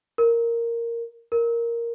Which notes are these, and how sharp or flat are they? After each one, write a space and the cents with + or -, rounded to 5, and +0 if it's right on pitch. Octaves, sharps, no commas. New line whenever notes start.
A#4 -5
A#4 +0